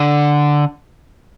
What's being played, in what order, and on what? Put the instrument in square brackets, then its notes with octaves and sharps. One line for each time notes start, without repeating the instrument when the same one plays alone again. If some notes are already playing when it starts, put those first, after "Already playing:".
Already playing: [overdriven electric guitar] D3